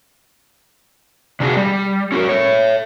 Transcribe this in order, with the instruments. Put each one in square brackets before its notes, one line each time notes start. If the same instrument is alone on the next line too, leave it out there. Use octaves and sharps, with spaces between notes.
[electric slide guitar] C3 D4 D#4 F#4 G#4
G3
C#4 F#4 G4 A#4
A4 C#5